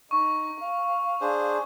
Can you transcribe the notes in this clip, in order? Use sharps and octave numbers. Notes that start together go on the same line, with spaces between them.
D#4 C#6
F5
D4 G#4 C5